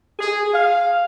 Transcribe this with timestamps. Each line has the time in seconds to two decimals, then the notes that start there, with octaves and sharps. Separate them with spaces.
0.19 G#4
0.53 F5